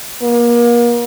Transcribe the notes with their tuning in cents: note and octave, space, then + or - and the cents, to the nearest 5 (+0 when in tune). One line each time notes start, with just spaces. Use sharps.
A#3 +35